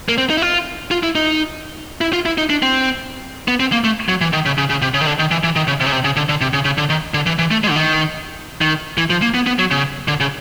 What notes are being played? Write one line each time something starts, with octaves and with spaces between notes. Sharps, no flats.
A#3
C4
D#4
E4
F4
F4
E4
D#4
E4
F4
E4
D#4
D4
C4
B3
C4
A#3
A3
F#3
E3
D#3
C#3
C#3
C#3
C3
C#3
D#3
D3
D#3
E3
E3
D#3
C#3
C3
C#3
C3
C#3
D3
D3
C3
C#3
C#3
D3
D#3
D3
E3
E3
A3
G#3
D3
D#3
D#3
E3
F3
A#3
B3
B3
F#3
C#3
D3
C#3